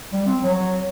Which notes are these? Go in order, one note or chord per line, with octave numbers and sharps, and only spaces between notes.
G3
C4
F#3